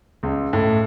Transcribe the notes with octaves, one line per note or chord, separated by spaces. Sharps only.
C#2
A2